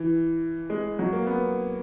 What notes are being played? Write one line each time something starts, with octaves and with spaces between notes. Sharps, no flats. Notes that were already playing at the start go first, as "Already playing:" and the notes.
Already playing: E3
G#3
F#3
A#3
B3